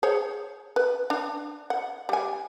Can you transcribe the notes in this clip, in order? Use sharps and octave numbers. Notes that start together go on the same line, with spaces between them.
G#4 C5 C#5
B4
D4
F#5
G3 G#5